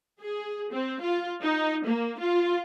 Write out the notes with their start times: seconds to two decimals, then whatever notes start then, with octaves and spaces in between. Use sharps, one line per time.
0.21 G#4
0.72 C4
1.01 F4
1.42 D#4
1.85 A#3
2.20 F4